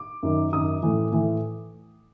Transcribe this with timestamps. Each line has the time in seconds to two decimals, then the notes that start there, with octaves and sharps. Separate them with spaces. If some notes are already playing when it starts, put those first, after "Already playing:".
Already playing: D6
0.23 F#2 D#3
0.53 F#2 D#3 D#6
0.83 A2 E3
1.12 A2 E3